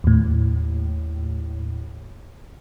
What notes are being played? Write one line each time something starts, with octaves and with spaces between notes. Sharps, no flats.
D#2 A2